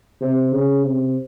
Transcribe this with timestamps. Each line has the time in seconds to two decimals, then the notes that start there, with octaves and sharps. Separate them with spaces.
0.20 C3
0.52 C#3
0.83 C3